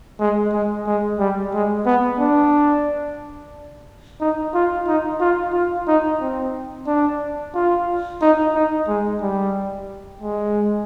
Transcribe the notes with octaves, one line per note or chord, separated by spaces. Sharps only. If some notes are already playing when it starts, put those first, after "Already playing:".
G#3
G#3
G#3
G3
G#3
B3
D4
D#4
F4
D#4
F4
F4
D#4
C4
D4
F4
D#4
D#4
G#3
G3
G#3